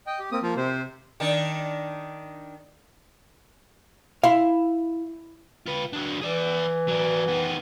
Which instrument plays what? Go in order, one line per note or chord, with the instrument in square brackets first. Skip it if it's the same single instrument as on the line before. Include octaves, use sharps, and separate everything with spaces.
[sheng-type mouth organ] D#5 G5
G4
A#3 C4 D#6
[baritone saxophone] F3 [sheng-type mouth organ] A#3
[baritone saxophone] C3 [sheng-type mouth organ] C5
[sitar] D#3 D4
[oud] E4 [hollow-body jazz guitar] F5 C6
[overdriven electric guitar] F4 B4
F#3 D4
[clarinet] E3 [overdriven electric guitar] G#4 D5
[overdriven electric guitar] F#3 D4
D#3 B3